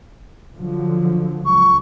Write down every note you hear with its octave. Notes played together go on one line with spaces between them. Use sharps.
D3 F3 F#3
C#2 C#6